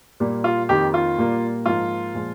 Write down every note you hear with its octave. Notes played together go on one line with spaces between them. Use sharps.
A#2 G3 A#3
F4
F2 D#3 A#3 G4
F4
A#2 G3 A#3
G#2 F3 A#3 F4
A#2 F3 G#3